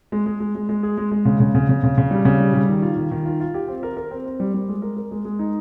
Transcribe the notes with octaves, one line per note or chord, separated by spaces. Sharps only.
G#3
G#3
G#3
G#3
G#3
G#4
G#3
G#3
C#3
C#3
C#3
C#3
C#3
C#3
G3
C#3
G3
G3
D#3
F4
D#3
D#3
F4
F4
G4
C4
A#4
A#4
C4
C4
G3
G3
G#3
A#4
A#4
G#3
G#3
D#4